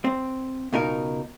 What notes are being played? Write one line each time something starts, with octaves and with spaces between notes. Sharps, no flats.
C4
C#2 B2 D#4 A#4